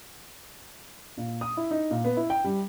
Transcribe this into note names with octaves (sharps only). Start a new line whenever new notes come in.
A#2
D#6
E4
D#4
A#2
B3
E4
G5
G3